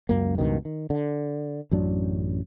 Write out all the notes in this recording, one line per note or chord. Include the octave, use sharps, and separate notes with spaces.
C#2 F#2 A#3
C#2 G2 B2 D#3
D#3
D3
A1 F#2 F#3 D4